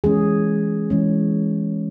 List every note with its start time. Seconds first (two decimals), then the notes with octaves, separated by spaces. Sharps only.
0.04 E3 G#3 C#4 G#4
0.90 E3 G#3 C#4